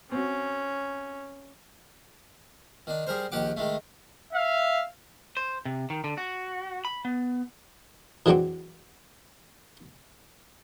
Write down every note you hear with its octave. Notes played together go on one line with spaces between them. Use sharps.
C4 C#4 F#4
D#3 D4
G3 G#4 A#4 C5
A#1 D#3 G4 F#5 D6
D#3 G#3 A3
E5 F5
C5
C3
D#3
D3
F#4
B5
B3
E3 F#3 G#3 C4 D4 F#4